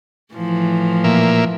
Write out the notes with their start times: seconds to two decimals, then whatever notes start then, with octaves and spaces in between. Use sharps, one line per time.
0.34 A2 E3 F3
1.04 A#2 A#3 E5